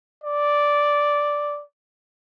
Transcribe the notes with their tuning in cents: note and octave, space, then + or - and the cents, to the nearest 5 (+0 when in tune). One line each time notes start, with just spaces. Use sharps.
D5 -5